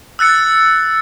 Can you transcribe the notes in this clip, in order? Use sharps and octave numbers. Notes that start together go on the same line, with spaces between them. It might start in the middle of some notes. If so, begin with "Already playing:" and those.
E6 F#6 A6 C#7